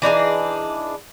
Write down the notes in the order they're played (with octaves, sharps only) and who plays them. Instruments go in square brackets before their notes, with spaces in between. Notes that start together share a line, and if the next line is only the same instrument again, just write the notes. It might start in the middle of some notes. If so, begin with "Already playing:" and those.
[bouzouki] E3 D4 D#4 G#4